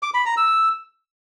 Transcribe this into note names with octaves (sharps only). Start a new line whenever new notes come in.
D6
B5
A#5
E6